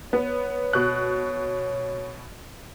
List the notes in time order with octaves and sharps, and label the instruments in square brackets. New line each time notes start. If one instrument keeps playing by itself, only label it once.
[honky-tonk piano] B3 [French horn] C#5
[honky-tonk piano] B2 F#6